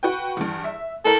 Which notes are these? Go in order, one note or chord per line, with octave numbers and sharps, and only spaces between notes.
F#4 B4 G5
E2 G2
E5
A2 A4 A#4 F#7